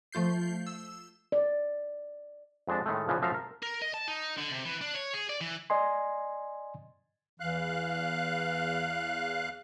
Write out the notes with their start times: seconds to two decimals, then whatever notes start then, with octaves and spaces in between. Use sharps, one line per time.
0.12 F3 A3 F4 G6 C7
0.67 E6
1.32 D5
2.67 F2 G#3 D4 A5
2.86 A2 D#3 G#3 A3
3.08 A#2 C#3 E3 F3
3.22 F#2 F3 A3 E5 F5 A#5
3.34 A#4
3.62 A#4
3.82 D#5
3.94 A5
4.08 D#4
4.38 D3
4.51 C3
4.66 E3
4.81 D4
4.95 C#5
5.14 G#4
5.29 D5
5.41 E3
5.70 D5 D#5 G#5 C6
7.40 E2 E3 F5 F#6